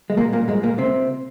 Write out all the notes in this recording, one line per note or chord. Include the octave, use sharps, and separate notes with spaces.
G#3
A#2 A#3
A#2 A#3
G#2 G#3
A#2 A#3
C3 C4